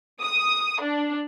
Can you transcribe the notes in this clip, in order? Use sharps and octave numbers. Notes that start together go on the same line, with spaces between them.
D#6
D4